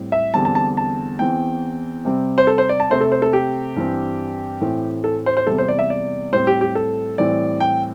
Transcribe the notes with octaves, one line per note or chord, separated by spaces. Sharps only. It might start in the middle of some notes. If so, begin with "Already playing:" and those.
Already playing: A2 G3 C4
E5
E2 D3 G3 C4 A5
A5
A5
A5
E2 E3 C4 G5
C3 G3 C4
C5
A4
C5
D5
A5
C3 A3 C4 C5
A4
C5
A4
G4
G2 E3 C4
A2 E3 A3 C4
A4
C5
C5
E2 C3 G3 A4
C5
D5
E5
D5
A2 G3 C4 C5
G4
G4
A4
A2 E3 G3 C4 D5
G5